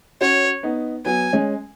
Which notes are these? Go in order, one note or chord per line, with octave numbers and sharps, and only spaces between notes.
C#4 F#4 C#5
B3 D#4
F#3 B3 G#5
G#3 C#4